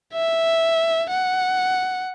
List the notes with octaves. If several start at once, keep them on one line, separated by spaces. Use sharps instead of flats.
E5
F#5